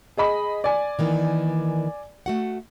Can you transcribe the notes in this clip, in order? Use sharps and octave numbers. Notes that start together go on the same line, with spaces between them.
G#4 D#5 B5
D5 G#5
D#3 E3 A#3
A3 F#4 F#5